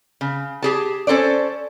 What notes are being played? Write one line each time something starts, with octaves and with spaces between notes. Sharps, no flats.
C#3
G4 G#4 A5
C#4 A4 C5 D5